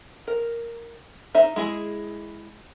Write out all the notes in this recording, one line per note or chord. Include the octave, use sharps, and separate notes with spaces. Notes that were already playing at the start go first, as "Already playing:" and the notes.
A#4
D#4 E5
G#3 E4 G#4